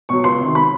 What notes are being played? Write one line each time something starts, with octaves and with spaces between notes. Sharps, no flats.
B2 F#3 C#6
C#2 C6
C3 D#3
B5